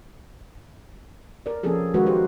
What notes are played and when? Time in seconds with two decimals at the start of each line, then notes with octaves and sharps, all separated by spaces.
1.46 A#4 D5
1.63 F3 A#3 C4 C#4 G#4 A4
1.94 D#3 G#3 A#3 F#4 B4
2.06 G4 C5